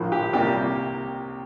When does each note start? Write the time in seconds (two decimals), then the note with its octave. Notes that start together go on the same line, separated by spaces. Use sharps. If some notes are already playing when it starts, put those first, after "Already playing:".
Already playing: A#1 A2 F3
0.12 G4
0.33 C2 C3 G3 A#3 G4